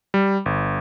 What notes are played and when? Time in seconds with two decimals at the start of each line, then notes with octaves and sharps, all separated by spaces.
0.14 G3
0.46 G1